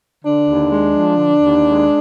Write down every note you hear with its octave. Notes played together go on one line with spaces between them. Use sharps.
D3 D4
D#2
G#3
F3
D3
D#2
G#3